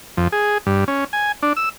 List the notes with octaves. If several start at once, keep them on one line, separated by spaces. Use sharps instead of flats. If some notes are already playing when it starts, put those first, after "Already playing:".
F2
G#4
G2
C#4
G#5
D4
E6